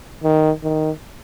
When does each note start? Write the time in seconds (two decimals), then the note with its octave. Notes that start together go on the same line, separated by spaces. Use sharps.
0.24 D#3
0.63 D#3